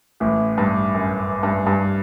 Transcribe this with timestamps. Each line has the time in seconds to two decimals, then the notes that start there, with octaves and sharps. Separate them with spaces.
0.20 A1 A2
0.58 G2
0.94 F#2
1.43 G2
1.66 G2